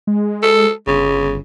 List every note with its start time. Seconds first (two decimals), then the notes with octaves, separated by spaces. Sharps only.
0.07 G#3
0.43 A4
0.87 G1 C#3